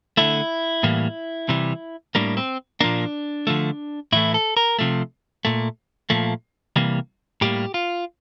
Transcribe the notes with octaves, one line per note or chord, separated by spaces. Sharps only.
D3 A3 E4
A2 E3 G3 A#3
C3 E3 G3
A2 G3 A#3 D4
C4
A#2 F3 A#3 D4
D3 F3 A3
A2 E3 A3 E4
A4
A#4
C3 F3 A3
A#2 A3
A#2 F3 A3
C3 E3 G3 A#3
A2 G3 A#3 G4
F4